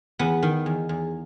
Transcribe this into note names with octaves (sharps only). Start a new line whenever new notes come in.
E2 B3
D#3
E2
E2